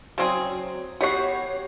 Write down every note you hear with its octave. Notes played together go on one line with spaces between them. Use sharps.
C#3 F#3 C4 G#4 C5 D5 C6
B3 F#4 G4 C#5 C7